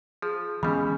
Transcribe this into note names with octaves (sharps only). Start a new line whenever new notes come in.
F3 G#4
C#3 E3 G3 G#3 B3 C#4 G5 B5